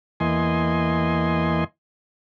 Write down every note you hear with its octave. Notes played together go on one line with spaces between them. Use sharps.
E2 E3 A#3 D#5 G#5 C6